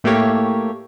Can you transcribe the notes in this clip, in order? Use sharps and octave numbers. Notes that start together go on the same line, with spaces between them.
A2 A3 A#3 G4 C#5